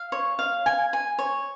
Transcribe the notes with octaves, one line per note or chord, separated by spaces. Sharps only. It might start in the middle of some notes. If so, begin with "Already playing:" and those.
Already playing: F5
C#5
F5
G#5
G#5
C#5